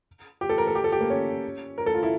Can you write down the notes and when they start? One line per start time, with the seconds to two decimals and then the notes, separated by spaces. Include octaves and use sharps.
0.41 G4
0.49 A4
0.58 A#4
0.67 A4
0.75 G4
0.84 A4
0.92 G4
1.01 A#3
1.10 C#4
1.78 A#4
1.86 A4
1.95 F4
2.03 E4